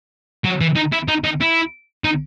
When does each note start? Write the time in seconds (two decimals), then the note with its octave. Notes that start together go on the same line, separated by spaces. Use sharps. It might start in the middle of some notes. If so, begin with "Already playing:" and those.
0.45 F#3
0.61 E3
0.76 D#4
0.93 E4
1.08 D#4
1.24 D#4
1.41 E4
2.04 D#4